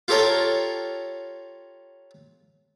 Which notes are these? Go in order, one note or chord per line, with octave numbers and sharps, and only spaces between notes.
F4 G4 A4 A#4 C#5 G5